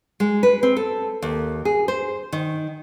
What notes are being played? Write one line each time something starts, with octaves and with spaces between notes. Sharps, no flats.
G#3
B4
C4
A4
D#2
G#4
C5
D#3